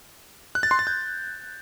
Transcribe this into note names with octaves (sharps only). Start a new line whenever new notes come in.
F#6
A6
C6
A6
G6